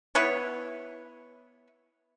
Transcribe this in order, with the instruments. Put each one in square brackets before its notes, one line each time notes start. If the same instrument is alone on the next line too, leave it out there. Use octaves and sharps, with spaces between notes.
[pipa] B3 E4 B4 C#5